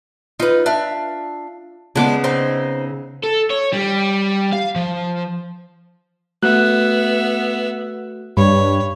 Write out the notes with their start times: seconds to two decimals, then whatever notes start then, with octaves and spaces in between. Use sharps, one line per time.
0.40 D#4 F4 B4
0.66 D4 E5 F5
1.96 C#3 G#3 B3 D4 D6
2.24 C4 D#4
3.24 A4
3.51 C#5
3.73 G3
4.52 F5
4.76 F3
6.43 A3 B3 F#4 E5 F#6
8.37 G2 C#5 B5